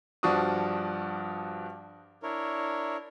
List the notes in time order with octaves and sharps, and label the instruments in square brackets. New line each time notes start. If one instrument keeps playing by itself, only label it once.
[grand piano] G2 F3 D4 F#4 C#6 D#6
[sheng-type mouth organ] D4 E4 A#4 C#5